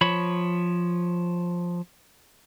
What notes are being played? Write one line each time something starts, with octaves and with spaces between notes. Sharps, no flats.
F3 C#5 B5